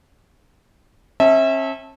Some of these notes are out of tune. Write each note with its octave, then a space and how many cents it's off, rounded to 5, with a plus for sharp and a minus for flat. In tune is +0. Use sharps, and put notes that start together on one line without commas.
C#4 -40 E5 -25 A5 +0